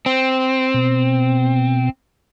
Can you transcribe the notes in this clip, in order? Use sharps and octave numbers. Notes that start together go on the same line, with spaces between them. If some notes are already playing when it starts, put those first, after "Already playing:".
C4
B2